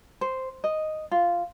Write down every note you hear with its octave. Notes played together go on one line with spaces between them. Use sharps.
C5
D#5
F4